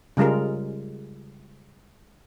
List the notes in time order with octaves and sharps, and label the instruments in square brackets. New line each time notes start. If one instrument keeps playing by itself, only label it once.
[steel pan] C#3 G3 G#3 F4 A#4